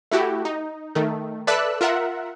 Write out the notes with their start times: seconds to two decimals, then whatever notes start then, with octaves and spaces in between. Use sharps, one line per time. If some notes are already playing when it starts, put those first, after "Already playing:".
0.11 A3 E4 F#4 G4
0.45 D#4
0.95 D#3 A3
1.47 A4 B4 D5 E5 E6 F#6
1.81 F4 A#4 E5 F#5